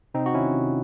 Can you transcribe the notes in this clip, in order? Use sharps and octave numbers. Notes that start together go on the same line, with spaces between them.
C3 C4 D#4
F#4
D#3 C#4 E4
C3